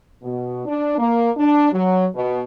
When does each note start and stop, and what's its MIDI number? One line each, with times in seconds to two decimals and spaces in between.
0.23 0.65 47
0.66 0.96 62
0.98 1.30 58
1.37 1.68 62
1.72 2.06 54
2.15 2.41 47